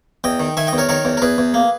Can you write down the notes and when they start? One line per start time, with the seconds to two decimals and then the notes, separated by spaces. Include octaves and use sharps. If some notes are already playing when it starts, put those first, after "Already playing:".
0.24 E2 D#5 G5
0.40 D#3
0.57 D#3 E5 G#5
0.67 D#5 G5
0.73 E2
0.78 A#4 C#5
0.89 D#3 A#4 C#5
1.05 E2
1.17 A#4
1.22 E2 G#4 B4
1.38 E2
1.54 A#3